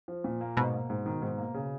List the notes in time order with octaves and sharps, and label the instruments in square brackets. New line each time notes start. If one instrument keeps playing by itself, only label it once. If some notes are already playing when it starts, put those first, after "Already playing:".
[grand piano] F3
A#2
A#3
[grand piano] G#2 [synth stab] B2
[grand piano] A#3
G#2
D#3
G#2
A#3
C#3